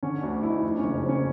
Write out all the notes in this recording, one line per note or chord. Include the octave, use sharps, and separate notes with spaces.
D3 C#4
D2 D4
D2 E4
D#4
F2 D4
F#1 C#4
C4
F#1 C#4